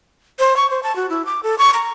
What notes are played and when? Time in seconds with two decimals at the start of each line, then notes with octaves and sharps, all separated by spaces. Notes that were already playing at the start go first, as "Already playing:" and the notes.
0.39 C5
0.57 C#6
0.70 C5
0.83 A5
0.96 F#4
1.10 E4
1.26 D6
1.43 A4
1.58 C#6
1.74 A#5